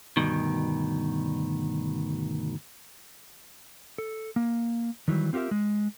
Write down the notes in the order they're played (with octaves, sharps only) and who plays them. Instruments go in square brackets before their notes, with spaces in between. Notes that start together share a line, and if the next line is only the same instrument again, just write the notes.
[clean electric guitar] D2 G2 B2 D#3
[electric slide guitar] A4
A#3
D#3 E3 F#3 G3
C4 F4 G4 A#4 E5
G#3